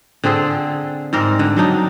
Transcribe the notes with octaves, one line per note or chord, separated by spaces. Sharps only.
D3 C4 G#4 A4
G#2 G3 C4 A#4
D3
F#3 D4 D#4